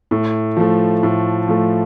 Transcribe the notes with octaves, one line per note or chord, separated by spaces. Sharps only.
A2
F3 A3
A2
F3 A3